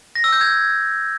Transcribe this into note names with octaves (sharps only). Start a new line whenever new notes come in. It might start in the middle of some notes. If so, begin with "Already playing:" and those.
A#6
E6
G6
G#6